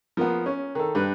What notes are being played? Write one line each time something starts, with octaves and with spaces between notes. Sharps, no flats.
F3 A#3 B3
C#4
D#3 A4
G2 B4